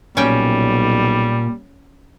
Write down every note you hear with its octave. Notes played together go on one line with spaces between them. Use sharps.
B1 A#2 G3 C#4 G5